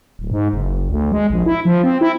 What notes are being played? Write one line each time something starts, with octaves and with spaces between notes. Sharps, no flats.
D1
G#2
F#1
D2
G#3
A#1
E4
F3
C4
E4